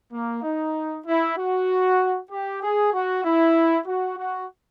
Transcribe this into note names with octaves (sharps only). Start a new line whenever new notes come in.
A#3
D#4
E4
F#4
G4
G#4
F#4
E4
F#4
F#4